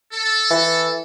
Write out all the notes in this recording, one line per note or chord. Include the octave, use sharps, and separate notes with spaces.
A4
E3